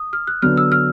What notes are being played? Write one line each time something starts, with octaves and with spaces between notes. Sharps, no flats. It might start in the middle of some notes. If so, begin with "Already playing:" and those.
Already playing: D#6
F6
F#6
D3 F#3 B3 F6
E6
F6